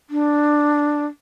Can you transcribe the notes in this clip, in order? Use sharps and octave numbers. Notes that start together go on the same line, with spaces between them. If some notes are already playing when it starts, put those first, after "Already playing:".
D4